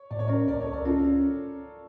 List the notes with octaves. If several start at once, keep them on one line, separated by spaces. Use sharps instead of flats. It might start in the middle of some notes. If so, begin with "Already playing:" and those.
Already playing: C#5
A2 D5
C#5
C#4 A#4 D5
C#2 A#4 D5
A4 C#5
C#2
A#4 D5
C#4 F4 A4
C#4